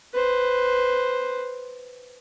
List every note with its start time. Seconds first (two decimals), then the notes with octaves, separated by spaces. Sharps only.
0.14 B4 C5